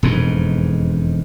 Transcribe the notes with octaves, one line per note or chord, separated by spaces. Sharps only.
E1 F2 G#2